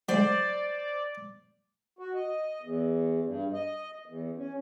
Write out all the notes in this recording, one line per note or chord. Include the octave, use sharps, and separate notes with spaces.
F#3 G#3 C5 D5
F#4
D#5
E2
G2
D#5
E2
C#4